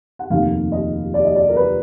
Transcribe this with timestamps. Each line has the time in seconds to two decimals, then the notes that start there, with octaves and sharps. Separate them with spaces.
0.19 F#5
0.30 F1 D#2 D#3 A#3 F5
0.72 D#5
1.14 D5
1.25 D#5
1.35 D5
1.49 A#4
1.56 B4